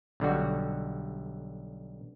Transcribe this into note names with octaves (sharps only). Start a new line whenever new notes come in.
B1 D3 G3 F#4